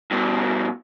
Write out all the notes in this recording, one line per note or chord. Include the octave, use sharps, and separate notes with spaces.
G2 B2